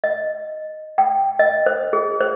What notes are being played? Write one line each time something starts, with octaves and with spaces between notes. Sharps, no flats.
D#5
G5
D#5
C5
G#4
C5